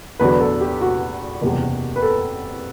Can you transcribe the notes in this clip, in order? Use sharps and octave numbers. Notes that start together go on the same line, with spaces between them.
E2 D3 F#3 B4
A4
G4
F#4
F#1 E2 C3 G3
B4
A4